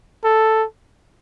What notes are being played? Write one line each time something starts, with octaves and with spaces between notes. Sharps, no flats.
A4